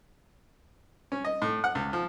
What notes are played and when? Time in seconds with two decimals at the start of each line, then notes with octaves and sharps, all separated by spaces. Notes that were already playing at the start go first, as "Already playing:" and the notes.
1.12 C#4
1.25 D#5
1.42 A2
1.64 F#5
1.75 C#2
1.93 F3